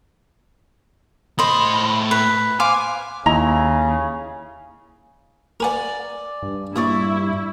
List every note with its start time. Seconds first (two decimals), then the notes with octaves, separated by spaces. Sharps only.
1.39 A2 C5 D#5 B5
2.11 B4
2.60 C5 F5 G#5 D6
3.26 D#2 C#3 E4 D#5 A#5
5.60 A#4 B4 D5 F#5 G#5 D6
6.43 G2
6.76 A#2 E4 D5 C#6 D#6